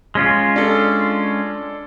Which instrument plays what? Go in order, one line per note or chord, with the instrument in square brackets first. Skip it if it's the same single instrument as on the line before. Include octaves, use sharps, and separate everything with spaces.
[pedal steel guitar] G#3 C#4 F4
[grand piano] D4 A4